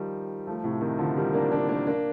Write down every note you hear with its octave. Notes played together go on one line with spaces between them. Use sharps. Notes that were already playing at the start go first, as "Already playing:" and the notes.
Already playing: D#3 F3 G3
F3 A3
A2 C3
C3 D#3
D3 F3
D#3 G3
A#3 D4
A#3 D4
A#3 D4
A#3 D4